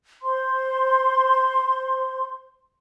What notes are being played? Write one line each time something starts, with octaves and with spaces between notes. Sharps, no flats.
C5 C6